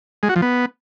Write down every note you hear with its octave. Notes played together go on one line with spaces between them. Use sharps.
G#3
F#4
F3
B3